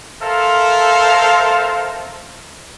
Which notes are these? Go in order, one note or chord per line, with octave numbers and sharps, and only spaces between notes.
A4 A#4 C5 E5 F5